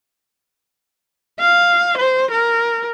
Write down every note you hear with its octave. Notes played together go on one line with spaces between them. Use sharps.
F5
C5
A#4